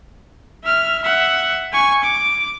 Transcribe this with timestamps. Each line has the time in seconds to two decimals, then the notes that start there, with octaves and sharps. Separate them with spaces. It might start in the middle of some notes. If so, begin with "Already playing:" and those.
0.64 E5 F6
1.03 E5 F#5
1.73 G#5 C#6
2.03 D6